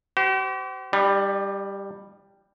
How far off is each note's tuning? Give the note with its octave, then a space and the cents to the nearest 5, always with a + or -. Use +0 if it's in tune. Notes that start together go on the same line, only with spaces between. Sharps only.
G4 -45 C5 -25
G3 +10 D#4 -45